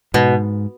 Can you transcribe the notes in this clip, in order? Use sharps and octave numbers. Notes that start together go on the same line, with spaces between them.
G#2 B2